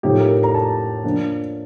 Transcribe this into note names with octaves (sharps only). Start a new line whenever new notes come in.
A2 F3 A3 D#4 G4
A#4
A#5
A5
F3 A#3 D4